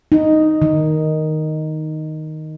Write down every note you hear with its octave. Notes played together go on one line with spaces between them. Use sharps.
D#4
D#3